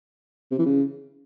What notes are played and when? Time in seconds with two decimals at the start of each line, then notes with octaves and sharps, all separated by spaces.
0.51 C3
0.59 E3
0.66 C#3